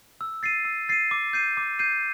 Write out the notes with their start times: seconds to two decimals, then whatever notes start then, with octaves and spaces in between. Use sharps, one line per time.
0.21 E6
0.43 A6 C7 D#7
0.65 E6
0.89 A6 C7 D#7
1.11 D6
1.33 G6 C7 D#7
1.57 D6
1.79 G6 C7 D#7